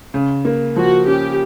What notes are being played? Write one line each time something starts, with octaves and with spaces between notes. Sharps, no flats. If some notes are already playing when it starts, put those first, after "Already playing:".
C#3
A#3
F3 F#4
C#4 G4